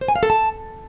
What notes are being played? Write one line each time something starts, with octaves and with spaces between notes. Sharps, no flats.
C5
G#5
F5
A4
A5